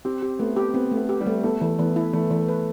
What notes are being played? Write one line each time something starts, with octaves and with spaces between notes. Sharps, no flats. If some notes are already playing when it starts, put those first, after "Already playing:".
C4 G4
G4
A3 B3
G4
B3 C4
A3
B3
G4
G3
A3
A3 B3
E3
E3 B3
E4
E3 A3
E3
B4